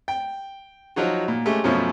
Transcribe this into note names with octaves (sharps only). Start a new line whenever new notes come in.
G5
F3 F#3 D#4 F#4
A#2
G#3 A3 C#4 G4
F#2 B2 F3 A3 C#4